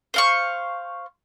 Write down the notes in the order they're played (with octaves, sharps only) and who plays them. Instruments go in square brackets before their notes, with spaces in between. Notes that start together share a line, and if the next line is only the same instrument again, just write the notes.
[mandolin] C5 F5 C#6